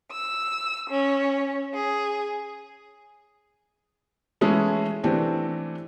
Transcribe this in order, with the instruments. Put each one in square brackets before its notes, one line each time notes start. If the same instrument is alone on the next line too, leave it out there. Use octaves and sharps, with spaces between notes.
[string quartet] E6
C#4
G#4
[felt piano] E3 G#3 A3 C#4 E4 G#4
E3 A3 C4 D4 G4